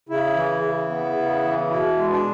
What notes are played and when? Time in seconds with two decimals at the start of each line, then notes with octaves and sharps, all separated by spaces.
0.09 C#3 E4
0.35 E3
0.63 C#3
0.89 B3
1.17 C#3
1.43 E3
1.70 B2 E4
1.97 G#3
2.11 D4